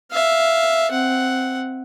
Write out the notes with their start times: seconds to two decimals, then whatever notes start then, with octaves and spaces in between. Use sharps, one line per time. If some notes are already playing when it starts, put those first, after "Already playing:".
0.12 E5 F5
0.92 C4 F#5